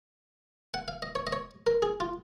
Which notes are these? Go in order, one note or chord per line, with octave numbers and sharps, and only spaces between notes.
F#5
F5
D#5
C#5
D#5
C#5
A#4
G#4
F4